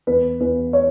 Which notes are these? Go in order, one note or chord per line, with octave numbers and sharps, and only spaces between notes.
E2 B4
E2 B4
C#5